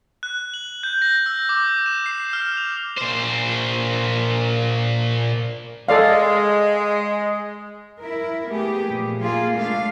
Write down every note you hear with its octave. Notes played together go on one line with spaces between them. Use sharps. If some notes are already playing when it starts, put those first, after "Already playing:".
F#6
F#7
G6
A#6
E6
D6
E7
C7
F6
F7
A#2 C5
G#3 A4 D5 F5
E4 A#4
A3 B3 G4 G#4
A#2 F3
A#3 F4 G#4
G#3 A3 D4 F5